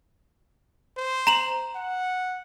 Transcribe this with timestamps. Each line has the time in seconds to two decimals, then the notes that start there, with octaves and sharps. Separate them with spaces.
0.97 C5
1.27 A#5 E7 F#7
1.75 F#5